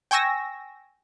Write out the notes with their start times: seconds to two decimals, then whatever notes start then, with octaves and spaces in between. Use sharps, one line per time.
0.11 G5 G#5 C#6 E6 A#6